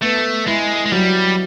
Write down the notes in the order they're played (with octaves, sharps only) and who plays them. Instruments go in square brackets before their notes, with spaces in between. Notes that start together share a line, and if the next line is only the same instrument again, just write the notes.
[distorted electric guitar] A3 [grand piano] B3
[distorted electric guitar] G#3 [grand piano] E4
[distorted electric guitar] G#3
[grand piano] F#3 [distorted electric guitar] G3